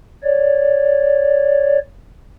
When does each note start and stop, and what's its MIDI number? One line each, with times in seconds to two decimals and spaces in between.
0.23 1.78 73
0.23 1.78 74